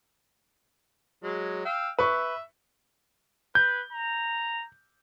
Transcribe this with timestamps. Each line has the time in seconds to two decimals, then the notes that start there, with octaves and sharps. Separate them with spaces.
1.24 F#3 G#3
1.65 F5 G5 E6
1.99 B4 E5 C#6
3.55 B4 G6
3.93 A#5